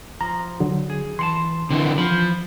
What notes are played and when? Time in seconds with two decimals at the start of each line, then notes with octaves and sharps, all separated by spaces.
0.21 F3 A#5
0.60 D3 F#3
0.90 G#4
1.19 E3 F#5 A5 C6
1.70 D3 E3 C4
1.98 E3 F3 B5